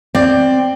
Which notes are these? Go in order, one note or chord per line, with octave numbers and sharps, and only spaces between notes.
C4 D5